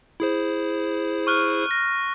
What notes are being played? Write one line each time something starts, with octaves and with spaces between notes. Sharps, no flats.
E4 G#4 C5
C#6 F6 F#6
A#6